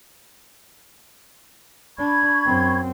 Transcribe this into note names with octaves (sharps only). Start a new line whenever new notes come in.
D4 B5 C#6 G#6
F#2 C4